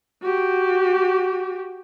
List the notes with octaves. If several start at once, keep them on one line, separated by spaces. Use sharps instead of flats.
F#4 G4